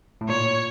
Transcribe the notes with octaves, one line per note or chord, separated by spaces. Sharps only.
A2
A#2 C#5